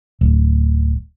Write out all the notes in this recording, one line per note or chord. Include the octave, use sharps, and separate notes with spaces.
D1